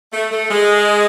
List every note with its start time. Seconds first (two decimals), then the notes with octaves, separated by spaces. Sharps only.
0.13 A3
0.31 A3
0.51 G#3